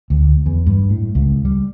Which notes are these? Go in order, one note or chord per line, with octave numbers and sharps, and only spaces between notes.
D2
E2
G2
A2
C#2
G3